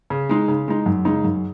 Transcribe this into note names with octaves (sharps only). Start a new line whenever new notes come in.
C#3
G#3 D#4
C#3
G#3 D#4
F#2
C#3 G#3 D#4
F#2